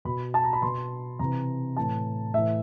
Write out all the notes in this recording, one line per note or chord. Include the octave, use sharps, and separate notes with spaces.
B2 B5
A5
A#5
B5
B2 C6
C3 E3 A#5
A2 E3 A5
A2 E3 E5